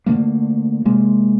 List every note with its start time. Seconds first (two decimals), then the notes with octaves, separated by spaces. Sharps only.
0.06 D3 D#3 A3 A#3
0.85 C3 G#3 A#3